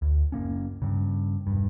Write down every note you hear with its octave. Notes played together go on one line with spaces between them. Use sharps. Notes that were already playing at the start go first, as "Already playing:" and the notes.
D2
F#1 A#2 A#3 C#4
G2 C#3
E1 G2